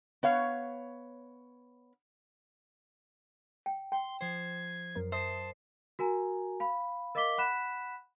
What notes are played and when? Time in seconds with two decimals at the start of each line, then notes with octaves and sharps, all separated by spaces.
0.23 B3 C#5 F5
3.66 G5
3.92 G5 C6
4.21 F3 C5 G#6
4.95 F#2 F#3 A#4
5.12 C5 E5 A5 D#6
5.99 F#4 A#4 G#5 A#5
6.60 F5 B5
7.15 A#4 D#5 F5 D6 B6 G7
7.38 F#5 B5 F#6 B6 E7